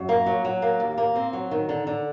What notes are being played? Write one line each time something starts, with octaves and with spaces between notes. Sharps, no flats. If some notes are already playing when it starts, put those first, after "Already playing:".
Already playing: F#2
A#3
F#3
F#3
A#3
D#2
A#3
C4
F#3
D#3
D3
D3